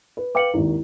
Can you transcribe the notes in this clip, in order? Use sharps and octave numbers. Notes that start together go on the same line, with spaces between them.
B4
B4 F5 G5 D6 C#7 F#7
G#1 D#2 E4